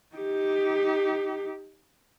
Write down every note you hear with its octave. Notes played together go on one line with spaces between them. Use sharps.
D#4 G4